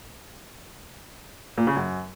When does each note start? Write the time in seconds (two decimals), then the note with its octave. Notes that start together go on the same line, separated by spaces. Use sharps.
1.58 A#2
1.67 C#3
1.76 F#2